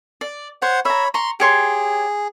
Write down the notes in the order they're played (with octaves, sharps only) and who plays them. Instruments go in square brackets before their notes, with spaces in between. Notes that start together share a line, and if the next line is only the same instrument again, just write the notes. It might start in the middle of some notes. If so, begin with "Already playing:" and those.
[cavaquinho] D5
[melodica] C5 F#5 [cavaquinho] C#5
[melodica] C#5 B5 [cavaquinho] E5 A#5
[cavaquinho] A#5 C#6 [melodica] C6
[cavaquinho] G4 C#5 C6 [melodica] G#4